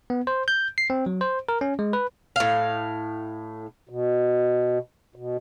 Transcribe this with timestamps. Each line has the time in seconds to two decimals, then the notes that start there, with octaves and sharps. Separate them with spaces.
0.10 B3
0.27 C5
0.48 G6
0.78 C7
0.90 C4
1.06 F#3
1.21 C5
1.49 A#4
1.61 C#4
1.79 G#3
1.93 B4
2.36 A2 F5
3.89 B2
5.16 B2